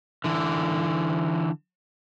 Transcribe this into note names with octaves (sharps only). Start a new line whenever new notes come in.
D3 E3